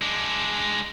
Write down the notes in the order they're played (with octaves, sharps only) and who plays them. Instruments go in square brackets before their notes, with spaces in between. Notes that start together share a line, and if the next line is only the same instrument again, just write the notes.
[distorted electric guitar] G#3 D4